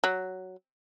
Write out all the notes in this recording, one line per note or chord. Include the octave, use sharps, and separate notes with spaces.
F#3